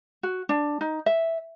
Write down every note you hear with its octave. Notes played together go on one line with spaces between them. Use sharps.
F#4
D4
D#4
E5